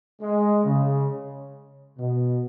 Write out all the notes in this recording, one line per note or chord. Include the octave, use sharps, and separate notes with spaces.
G#3
C#3
B2